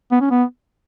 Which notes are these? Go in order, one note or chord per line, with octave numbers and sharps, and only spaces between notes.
B3
C#4
B3